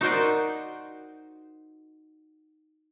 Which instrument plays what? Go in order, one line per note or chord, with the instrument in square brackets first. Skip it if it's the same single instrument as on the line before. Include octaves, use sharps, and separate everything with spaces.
[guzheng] D#4 F#4 A#4 C5 D5 D#5